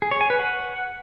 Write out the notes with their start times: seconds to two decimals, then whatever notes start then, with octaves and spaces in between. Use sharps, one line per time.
0.02 G#4
0.11 C#5
0.21 G#5
0.30 B4
0.39 F#5